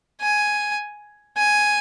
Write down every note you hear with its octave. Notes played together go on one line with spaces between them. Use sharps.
G#5
G#5